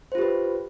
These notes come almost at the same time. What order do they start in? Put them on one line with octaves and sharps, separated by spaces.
C5 F4 G4 B4